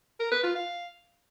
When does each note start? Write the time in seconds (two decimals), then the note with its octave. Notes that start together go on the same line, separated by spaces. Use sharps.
0.20 A#4
0.31 B4
0.43 F4
0.55 F5